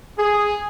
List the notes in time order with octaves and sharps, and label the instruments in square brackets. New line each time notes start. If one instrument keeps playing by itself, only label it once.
[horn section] G#4